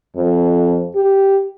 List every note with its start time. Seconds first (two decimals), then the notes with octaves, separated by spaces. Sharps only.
0.16 F2
0.95 G4